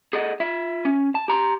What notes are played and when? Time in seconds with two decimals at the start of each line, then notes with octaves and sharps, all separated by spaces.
0.13 G#4 A4 D#5 F#5
0.40 F4 E5
0.85 C#4
1.15 A5
1.28 G4 A#5 C6